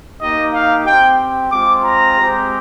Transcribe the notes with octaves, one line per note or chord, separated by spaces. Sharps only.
A#3 D#4 G4 D#5
F5
C4 G4 G5
G#3 C4 F4 D6
A#5
G#3 C4 G4